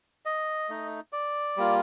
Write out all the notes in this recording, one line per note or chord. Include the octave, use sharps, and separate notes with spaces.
D#5
A3 D#4
D5
G3 A#3 F4